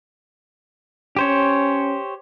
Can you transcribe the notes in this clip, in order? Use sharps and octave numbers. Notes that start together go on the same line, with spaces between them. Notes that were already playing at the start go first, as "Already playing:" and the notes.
C#4 G4 C5 C#5